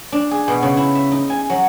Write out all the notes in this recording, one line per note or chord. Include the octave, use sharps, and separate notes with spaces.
D4
G#4
B2
C#3
E4
E5
D#4
G#5
F#3